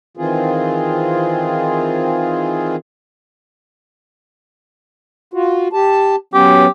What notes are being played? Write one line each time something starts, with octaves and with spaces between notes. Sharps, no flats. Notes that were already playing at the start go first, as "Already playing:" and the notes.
D#3 E3 C4 F4 G#4
F4 F#4
G4 A5
F#3 B3 C#4 G4